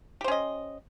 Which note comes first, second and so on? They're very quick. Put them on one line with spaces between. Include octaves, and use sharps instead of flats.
G4 C5 C#4 D#5